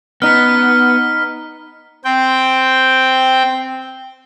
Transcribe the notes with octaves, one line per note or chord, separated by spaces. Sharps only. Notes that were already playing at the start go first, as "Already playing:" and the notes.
B3 D#4 B4 F6 B6
C4 G5